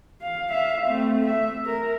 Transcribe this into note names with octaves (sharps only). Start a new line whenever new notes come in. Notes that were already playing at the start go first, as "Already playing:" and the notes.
F5
E5 F5
A3 C4
E5
A#4